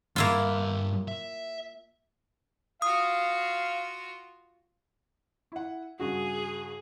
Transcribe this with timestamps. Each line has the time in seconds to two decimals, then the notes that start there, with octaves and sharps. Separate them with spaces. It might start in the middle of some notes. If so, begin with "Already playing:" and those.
0.16 G2 A#3 E4 F4 F#5
1.08 E5
2.82 F4 F#4 F5 D#6
5.52 E4 F#5
6.00 G2 C#3 F#4 G#4